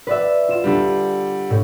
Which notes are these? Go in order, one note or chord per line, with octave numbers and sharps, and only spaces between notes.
B4 D5 E5
F4 E7
D3 G3
A2